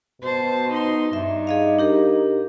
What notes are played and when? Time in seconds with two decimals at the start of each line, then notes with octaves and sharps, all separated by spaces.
0.22 B2 C5 A5
0.70 D#4 C6
1.13 G2 D#4 E5
1.47 G#4 D#5 F5
1.79 D4 G4 A#4